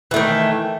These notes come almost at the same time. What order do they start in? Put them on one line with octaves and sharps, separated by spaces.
E3 A3 D#3